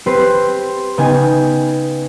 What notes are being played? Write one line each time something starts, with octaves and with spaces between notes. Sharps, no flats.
C4 G4 B4 C6 F#6
C#3 B3 D#4 G5 G#5